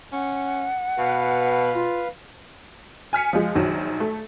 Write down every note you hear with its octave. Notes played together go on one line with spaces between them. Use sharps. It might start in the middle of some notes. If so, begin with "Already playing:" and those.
C#4 F#5
B2 B4 F5
F4
G#5 F6 B6 C#7
F3 G#3
A#1 D#3 F#3
A3